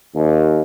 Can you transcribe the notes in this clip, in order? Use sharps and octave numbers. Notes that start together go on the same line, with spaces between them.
D#2